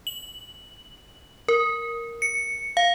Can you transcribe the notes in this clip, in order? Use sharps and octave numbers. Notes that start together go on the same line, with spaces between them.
F#7
A#4
C#7
F5